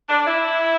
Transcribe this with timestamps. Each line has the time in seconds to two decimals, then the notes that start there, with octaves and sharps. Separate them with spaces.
0.09 D4
0.27 E4